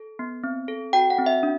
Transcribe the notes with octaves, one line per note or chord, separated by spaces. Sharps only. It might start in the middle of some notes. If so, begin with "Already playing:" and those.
Already playing: A4
B3
C4
A4
F#4 G5
F#5
C4
E5
D4